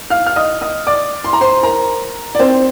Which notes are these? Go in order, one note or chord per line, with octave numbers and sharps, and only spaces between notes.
F5 F6
F6
D#5 D#6
D#5 D#6
D5 D6
C6
A#5
C5 C6
A#4 A#5
D5
C4 C5